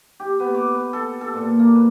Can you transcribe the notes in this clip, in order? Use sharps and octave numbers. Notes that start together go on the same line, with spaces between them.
G4
B3
D6
B4
A4
A4
A#2
A#3
B4